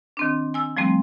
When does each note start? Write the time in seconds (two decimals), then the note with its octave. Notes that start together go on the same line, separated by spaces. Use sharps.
0.17 D#3 C4 D4
0.54 G#5 E6
0.77 F3 G3 A3 C4